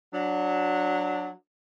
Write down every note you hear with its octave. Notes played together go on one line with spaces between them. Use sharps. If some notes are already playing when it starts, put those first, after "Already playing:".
F#3 D4